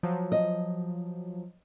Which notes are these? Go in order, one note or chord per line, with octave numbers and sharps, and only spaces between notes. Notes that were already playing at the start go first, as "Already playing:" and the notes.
F3 F#3
D#5